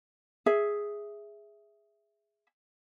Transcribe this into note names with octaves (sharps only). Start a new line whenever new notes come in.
G#4 E5